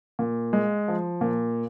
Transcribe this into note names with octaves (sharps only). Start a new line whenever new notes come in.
A#2
G#3
F3
A#2